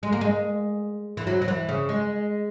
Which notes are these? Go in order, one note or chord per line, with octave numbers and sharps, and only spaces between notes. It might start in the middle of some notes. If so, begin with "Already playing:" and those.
G#3
A#3
G#3
E3
F#3
F#3
E3
C#3
G#3